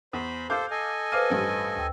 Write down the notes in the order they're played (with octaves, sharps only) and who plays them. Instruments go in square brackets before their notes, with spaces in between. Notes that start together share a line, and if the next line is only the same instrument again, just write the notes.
[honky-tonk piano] E2 [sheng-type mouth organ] C5 B5
[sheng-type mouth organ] A4 C5 [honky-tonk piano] F5 D6 G6
[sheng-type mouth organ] A4 D#5 G#5
[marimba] B4 C5 F6 [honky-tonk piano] F5 D6 D#7
[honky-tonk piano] A1 G2
[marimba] D2 G5 E6